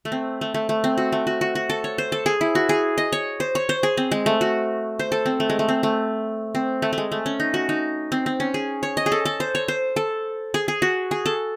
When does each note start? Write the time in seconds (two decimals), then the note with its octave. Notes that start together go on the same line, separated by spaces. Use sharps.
0.05 A3
0.12 C4
0.41 A3
0.54 A3
0.69 A3
0.84 C4
0.98 F#4
1.12 A3
1.27 F#4
1.41 F#4
1.55 F#4
1.70 A4
1.84 C#5
1.98 C5
2.12 A4
2.26 G#4
2.41 E4
2.55 F#4
2.69 G#4
2.98 D#5
3.12 C#5
3.40 C5
3.55 C#5
3.69 C5
3.83 G#4
3.97 C4
4.12 G#3
4.26 A3
4.41 F#4
4.99 C5
5.12 A4
5.26 C4
5.40 A3
5.50 G#3
5.59 A3
5.69 C4
5.83 A3
6.55 C4
6.82 A3
6.93 A3
6.98 G#3
7.12 A3
7.26 C#4
7.40 D#4
7.54 F#4
7.69 D#4
8.12 C4
8.26 C4
8.40 C#4
8.54 G#4
8.83 C#5
8.97 D#5
9.06 G#4
9.12 A4
9.25 A4
9.40 C5
9.55 C#5
9.68 C5
9.96 A4
10.54 G#4
10.68 G#4
10.82 F#4
11.11 G#4
11.26 A4